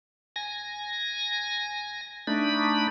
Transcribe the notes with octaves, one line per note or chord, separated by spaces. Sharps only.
G#5 A#6
A3 D4 D#4 B5